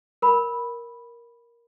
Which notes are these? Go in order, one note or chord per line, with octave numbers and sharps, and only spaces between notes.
A#4 B5